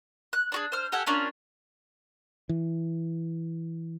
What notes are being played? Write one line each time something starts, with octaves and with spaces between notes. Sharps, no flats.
F#6
D4 F#4 G#4
C5 F6
G4 A4 F#5 G#5
A#3 C#4 D4 F4
E3